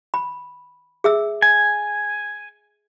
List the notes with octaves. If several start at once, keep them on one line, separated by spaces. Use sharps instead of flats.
B5
G#4 E5 E6
G#5